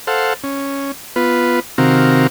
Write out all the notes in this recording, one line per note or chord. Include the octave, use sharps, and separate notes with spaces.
A4 C5 F5 F#5
C#4
B3 F4 B4
C3 D#3 C4 F#4 A#4 F5